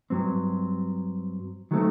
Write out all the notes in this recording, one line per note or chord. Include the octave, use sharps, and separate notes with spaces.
G2 F#3 C4
D#3 F#3 A3 C4